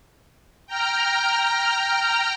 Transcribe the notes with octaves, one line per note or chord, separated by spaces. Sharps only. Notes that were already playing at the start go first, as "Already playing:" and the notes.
G5 A#5 F6